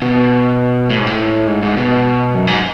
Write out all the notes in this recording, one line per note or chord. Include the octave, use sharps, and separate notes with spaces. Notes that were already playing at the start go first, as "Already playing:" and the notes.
B2
A2
G#2
A2
G#2
G#2
B2
F#2
G#2